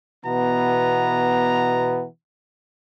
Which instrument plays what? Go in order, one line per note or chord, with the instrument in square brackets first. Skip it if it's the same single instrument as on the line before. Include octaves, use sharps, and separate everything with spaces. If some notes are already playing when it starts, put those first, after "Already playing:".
[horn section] B2 E3 B3 A#5